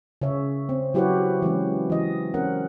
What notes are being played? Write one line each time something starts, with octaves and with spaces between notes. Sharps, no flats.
C#3 G#4 C#5 E5
C4
F#3 E4 G4 B4 C#5 F#5
E3 G#3 C#4
E3 D#5
C4 C#4 A#4 F#5